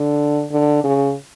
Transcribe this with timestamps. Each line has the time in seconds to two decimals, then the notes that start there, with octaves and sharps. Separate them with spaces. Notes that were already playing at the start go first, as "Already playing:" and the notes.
Already playing: D3
0.52 D3
0.84 C#3